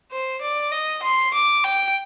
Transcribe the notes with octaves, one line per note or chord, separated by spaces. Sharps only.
C5
D5
D#5
C6
D6
G5